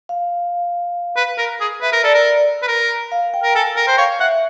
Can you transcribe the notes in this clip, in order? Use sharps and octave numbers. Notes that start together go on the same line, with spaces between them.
F5
B4
A#4
G#4
B4 E5
A#4
A4 D5
A#4
D5
B4
A#4
F5
G5
A#4
A4 G#5
A#4 G5
C5
C#5 F5
E5 F#5